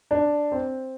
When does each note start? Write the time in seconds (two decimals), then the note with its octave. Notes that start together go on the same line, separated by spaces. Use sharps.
0.11 D4
0.52 C4